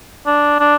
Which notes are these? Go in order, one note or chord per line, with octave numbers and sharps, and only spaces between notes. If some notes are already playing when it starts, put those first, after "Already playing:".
D4
D4